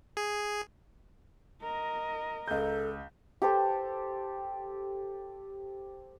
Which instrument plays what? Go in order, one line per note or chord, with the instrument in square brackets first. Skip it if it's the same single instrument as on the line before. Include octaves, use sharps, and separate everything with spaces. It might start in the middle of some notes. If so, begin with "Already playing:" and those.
[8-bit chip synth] G#4
[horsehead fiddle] A#4 D#5
[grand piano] C#2 G6 [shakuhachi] A4
[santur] G4 A4 C5